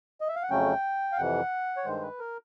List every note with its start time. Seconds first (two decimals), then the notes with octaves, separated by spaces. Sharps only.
0.21 D#5
0.28 E5
0.36 F5
0.43 F#5
0.50 F2 C#3 F#3 A3 C#4 G5
1.12 F5
1.18 F2 C3 E3 F#5
1.77 C#5
1.85 G2 D#3 G#3 C5
2.02 B4
2.20 A#4